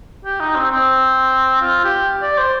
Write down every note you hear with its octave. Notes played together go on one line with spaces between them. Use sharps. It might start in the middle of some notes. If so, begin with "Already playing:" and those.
G4
D#4
C4
C4
F4
G4
D5
C5